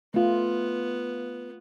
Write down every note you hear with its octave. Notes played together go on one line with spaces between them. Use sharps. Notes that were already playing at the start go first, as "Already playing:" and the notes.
A3 B3 F4